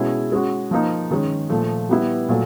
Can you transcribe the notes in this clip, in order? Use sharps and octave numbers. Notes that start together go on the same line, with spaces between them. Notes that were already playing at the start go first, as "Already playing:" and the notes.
Already playing: B2 G#3 C#4 E4 G#4
G#3 C#4 F#4
F3 A#3 D#4
D#3 G#3 C#4
A#2 F3 A3
G3 B3 E4
A#2 F#3 A3